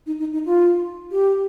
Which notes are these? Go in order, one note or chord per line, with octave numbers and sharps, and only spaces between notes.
D#4
D#4
D#4
F4
G4